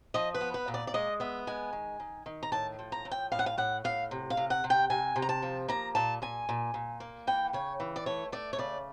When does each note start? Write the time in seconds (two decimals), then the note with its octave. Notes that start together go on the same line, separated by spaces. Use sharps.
0.14 F3 D#5
0.34 B4
0.41 B3
0.54 B4
0.68 A#2
0.74 D5
0.87 D5
0.94 G#3 D#5
1.20 B3 E5
1.47 G#3 G#5
1.73 D#3
2.00 D#3
2.26 D#3
2.43 A#5
2.52 A2 A5
2.79 F3
2.92 A#5
3.05 A2
3.11 G5
3.32 A2 F5
3.39 F#5
3.46 F5
3.58 A2 F#5
3.84 A2 F5
4.11 C3
4.30 F5
4.37 C3
4.50 F#5
4.64 C3
4.70 G5
4.90 C3 G#5
5.16 C3
5.22 A#5
5.29 A5
5.42 F3
5.68 A#3 A#5
5.95 A#2 A5
6.22 A#2 G#5
6.49 A#2
6.74 A#2
7.00 A#3
7.27 E3 G5
7.53 C#3 C#5
7.80 E3
7.96 D5
8.06 A3 C#5
8.32 A3 D5
8.53 C#5
8.58 C#3 D5